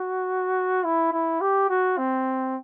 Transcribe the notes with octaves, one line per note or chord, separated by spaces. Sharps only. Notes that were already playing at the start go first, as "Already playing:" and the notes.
Already playing: F#4
E4
E4
G4
F#4
C4